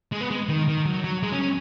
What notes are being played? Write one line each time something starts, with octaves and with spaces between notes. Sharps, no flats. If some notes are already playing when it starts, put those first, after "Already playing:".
G#3
B3
G#3
D#3
D#3
F#3
F#3
G#3
C#4
C#4